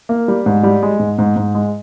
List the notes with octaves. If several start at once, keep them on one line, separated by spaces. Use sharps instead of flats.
A#3
G3
G#2
G3
G#3
G#2
G#2
G#2
G#3